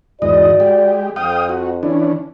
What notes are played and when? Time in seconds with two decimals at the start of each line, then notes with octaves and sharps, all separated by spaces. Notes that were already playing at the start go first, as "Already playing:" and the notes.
0.22 E2 G#2 F#4 D5 D#5
0.60 G#3 G4
1.16 F2 F5 G5 D#6
1.49 F#4
1.83 E3 C#4 D4